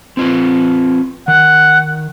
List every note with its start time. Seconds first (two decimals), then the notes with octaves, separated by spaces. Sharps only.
0.17 C4 F4 B4
1.28 D#3 F#5